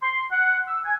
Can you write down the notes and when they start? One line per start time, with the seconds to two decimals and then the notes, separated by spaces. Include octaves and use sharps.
0.02 C6
0.31 F#5
0.68 E6
0.85 G#5